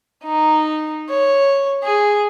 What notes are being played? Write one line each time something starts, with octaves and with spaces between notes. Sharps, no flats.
D#4
C#5
G#4